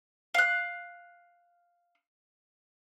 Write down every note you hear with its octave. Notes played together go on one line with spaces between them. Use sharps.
F5 F#6